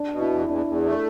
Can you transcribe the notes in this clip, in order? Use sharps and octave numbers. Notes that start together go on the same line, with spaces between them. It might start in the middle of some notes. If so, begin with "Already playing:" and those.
Already playing: D4
B2
E4
E2
E2 D4
E2
A3